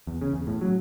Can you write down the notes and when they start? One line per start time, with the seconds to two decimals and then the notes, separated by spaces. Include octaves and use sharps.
0.07 E2
0.22 C#3
0.33 E2
0.47 A2
0.61 F#3